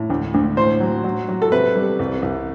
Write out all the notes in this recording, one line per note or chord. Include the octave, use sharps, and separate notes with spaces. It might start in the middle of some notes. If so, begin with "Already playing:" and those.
Already playing: A2
D2
D2
A2 C5
F#3
F#3
F#3
A4
C3 B4
G3
C2
C2